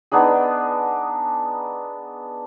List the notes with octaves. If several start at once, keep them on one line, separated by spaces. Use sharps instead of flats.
B3 D4 D#4 G#4